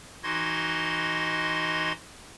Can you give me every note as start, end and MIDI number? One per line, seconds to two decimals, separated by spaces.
0.23 1.92 52
0.23 1.92 63
0.23 1.92 66
0.23 1.92 75
0.23 1.92 84
0.23 1.92 92